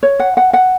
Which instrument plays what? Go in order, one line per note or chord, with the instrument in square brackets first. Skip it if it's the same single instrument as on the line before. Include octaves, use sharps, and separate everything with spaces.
[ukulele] C#5
F#5
F#5
F#5